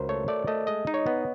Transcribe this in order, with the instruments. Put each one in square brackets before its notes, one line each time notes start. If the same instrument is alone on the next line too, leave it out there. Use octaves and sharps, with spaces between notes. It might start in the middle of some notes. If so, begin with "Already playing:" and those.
Already playing: [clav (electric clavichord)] C#2 [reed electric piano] F#4 A#4 C5
[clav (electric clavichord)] A3 [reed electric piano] C#5
[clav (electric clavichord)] A3 [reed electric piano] D5
[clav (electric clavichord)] A3 [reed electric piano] D#5
[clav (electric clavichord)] G#3 [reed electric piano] D#5
[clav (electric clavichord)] D#4
[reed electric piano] C#5
[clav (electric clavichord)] B3